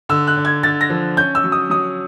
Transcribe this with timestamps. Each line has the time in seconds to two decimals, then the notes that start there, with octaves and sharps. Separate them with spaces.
0.09 D3 E6
0.27 F#6
0.36 D3
0.45 G#6
0.63 D3 A6
0.81 A#6
0.90 F3
1.17 C#4 G6
1.35 E6
1.44 F#3
1.52 D#6
1.70 F#3 D#6